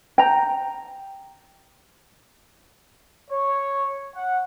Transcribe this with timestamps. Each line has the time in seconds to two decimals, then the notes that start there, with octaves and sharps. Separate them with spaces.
0.18 G5 A#5
3.29 C#5
4.15 F#5